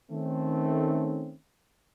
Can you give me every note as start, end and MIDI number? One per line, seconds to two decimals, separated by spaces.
0.11 1.34 51
0.11 1.34 57
0.11 1.34 60
0.11 1.34 61